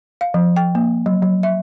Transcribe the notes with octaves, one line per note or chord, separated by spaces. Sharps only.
F5
F3
G5
A#3
F#3
F#3
E5